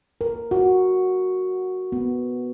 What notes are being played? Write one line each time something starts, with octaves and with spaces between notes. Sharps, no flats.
A#4
F#4
B3